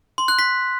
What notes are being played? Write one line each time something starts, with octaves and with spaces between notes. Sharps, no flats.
C6
F#6
B6